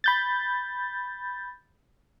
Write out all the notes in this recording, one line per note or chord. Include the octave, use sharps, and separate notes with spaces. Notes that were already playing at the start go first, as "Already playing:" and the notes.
B5 G6 A6